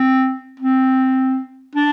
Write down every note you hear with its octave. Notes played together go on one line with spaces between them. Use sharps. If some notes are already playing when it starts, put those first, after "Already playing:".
Already playing: C4
C4
D4